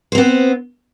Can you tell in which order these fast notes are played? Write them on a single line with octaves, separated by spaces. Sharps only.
C5 C4 B3